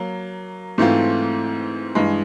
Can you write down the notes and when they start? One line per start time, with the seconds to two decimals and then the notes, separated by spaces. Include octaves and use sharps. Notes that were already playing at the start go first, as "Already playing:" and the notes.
Already playing: F#3 A#3
0.78 G#2 E3 A3 C4 F4
1.95 G2 E3 G#3